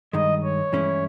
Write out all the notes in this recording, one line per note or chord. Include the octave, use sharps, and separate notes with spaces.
G2 D#3 G#3 D#5
C#5
G2 E3 G#3 C#4 E4